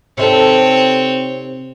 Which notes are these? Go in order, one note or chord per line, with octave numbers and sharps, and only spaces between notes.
C3 C4 D#4 A4 C#5